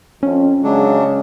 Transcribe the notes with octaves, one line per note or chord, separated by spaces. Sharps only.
F2 C#4
C#3 F#3 G#3 D4